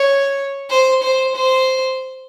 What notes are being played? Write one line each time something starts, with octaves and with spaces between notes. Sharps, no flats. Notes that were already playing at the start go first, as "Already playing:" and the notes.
Already playing: C#5
C5
C5
C5